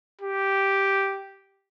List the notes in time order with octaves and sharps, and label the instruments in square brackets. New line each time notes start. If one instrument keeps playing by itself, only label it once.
[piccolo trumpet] G4